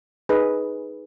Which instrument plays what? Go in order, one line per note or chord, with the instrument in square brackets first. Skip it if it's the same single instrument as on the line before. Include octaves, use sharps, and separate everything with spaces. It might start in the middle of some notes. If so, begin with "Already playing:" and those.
[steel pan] D#4 G#4 B4 D#5